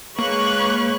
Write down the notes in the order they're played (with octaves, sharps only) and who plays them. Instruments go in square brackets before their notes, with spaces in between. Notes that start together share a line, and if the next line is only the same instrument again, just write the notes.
[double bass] G#3 [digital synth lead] A#3 [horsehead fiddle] B4 C#5 [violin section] C#6 F#6